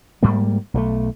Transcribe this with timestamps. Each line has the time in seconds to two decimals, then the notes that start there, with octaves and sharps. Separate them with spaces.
0.23 G#2 G3 A#3
0.74 B1 F3 A3